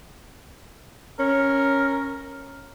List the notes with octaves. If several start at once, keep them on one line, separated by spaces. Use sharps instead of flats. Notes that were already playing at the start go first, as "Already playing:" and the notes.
C#4 A#4